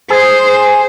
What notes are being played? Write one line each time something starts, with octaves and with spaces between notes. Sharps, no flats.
G#4 C5